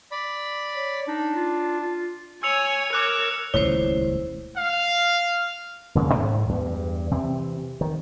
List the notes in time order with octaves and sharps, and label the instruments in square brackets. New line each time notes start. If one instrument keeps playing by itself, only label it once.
[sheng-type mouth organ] D5 B5
[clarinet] C#5
[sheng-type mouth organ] D4 [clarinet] D#4
[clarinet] F4
F4
[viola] C#5 G#5 [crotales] E6 C#7 F7
[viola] A#4 C#5 [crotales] D6 F#6
[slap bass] D#1 C#2 A3 [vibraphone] E4 C5 [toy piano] C#5
[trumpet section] F5
[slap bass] D#1 C#3 G#3 A#3
G#2
E2 G2
C3 E3 C4
D#3